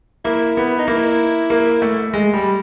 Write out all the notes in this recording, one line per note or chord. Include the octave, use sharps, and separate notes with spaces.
A#3 E4
B3
D#4
A#3 E4
A#3
A3
G#3
G3